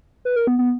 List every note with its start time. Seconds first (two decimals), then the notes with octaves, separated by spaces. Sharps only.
0.25 B4
0.36 A#4
0.47 B3
0.59 B3